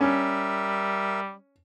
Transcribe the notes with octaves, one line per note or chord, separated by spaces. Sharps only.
G3 C#4 A#4 E5